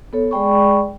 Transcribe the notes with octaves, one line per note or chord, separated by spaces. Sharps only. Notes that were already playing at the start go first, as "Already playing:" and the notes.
B3 A4 C#5
G#3 G#4 D5 G5 B5 C#6